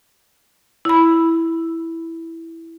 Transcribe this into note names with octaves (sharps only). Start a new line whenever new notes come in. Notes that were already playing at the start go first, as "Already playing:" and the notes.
E4 B5